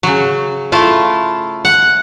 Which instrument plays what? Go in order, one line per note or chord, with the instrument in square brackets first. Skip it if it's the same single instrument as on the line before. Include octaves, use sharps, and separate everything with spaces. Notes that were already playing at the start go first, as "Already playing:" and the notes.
[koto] C#3 F#3
A3 E4 F4
F#5